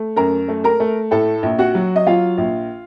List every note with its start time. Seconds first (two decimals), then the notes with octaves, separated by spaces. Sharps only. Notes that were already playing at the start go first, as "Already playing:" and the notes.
Already playing: A3
0.16 F#2 A#4 A#5
0.48 A3
0.64 A#4 A#5
0.80 A3
1.11 A2 A4 A5
1.43 A#1
1.59 F#4 F#5
1.75 F#3
1.96 D#5
2.06 F#3 F4 F5
2.38 A#1